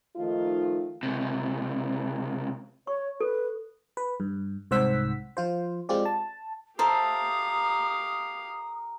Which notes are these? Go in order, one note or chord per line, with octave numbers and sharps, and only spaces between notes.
D#3 F3 A3 D#4 F4
C#2 C3
C#5 C#6
A4 B4
B4
G2
C2 G#2 C5 F#5 E6 B6
F3 F4 C5
G#3 C4 F4 G4 D5
A5
G4 A#4 C5 E5 F5 A5 D#6